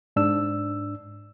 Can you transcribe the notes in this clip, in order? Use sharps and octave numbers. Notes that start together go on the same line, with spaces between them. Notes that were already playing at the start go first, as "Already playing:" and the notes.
G#2 D4 E6